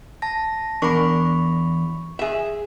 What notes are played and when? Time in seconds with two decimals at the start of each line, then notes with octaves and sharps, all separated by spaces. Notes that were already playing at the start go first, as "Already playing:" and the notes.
0.22 A5 A#6
0.82 E2 D4 A#4 B5 C#6
2.19 G#4 E5